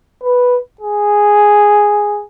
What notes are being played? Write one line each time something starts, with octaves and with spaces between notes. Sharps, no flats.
B4
G#4